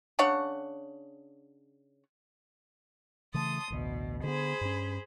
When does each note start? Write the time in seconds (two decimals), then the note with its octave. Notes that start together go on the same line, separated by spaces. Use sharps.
0.19 C#3 D4 C#5 F#5
3.34 C#3 E3 A3 A5 C6 D#6
3.70 A1 D2 B2
4.23 D3 B3 G#4 C5 B5
4.61 G2 C#4